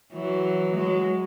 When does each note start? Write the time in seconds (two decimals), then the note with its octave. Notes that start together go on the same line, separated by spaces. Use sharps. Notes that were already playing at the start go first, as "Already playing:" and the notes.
0.13 E3 F#3
0.75 F#3 G#3